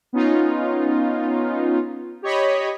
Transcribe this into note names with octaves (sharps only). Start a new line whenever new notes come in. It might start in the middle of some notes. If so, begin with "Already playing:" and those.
B3 C#4 D#4 F4
G4 C#5 D#5 B5